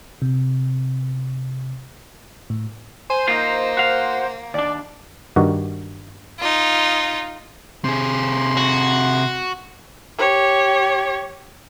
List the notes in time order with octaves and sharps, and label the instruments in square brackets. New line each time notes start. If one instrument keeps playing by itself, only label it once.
[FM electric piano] C3
A2
[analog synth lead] C5 [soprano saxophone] G#5
[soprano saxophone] A#3 [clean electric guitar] D#4 F4
[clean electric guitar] F#4 F5
[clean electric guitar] D#2 D4 [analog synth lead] D5
[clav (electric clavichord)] G2 D#3 F#4
[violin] D#4 F4
[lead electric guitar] C3 G#4 [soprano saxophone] C6
[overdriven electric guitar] F#4
[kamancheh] G4 C#5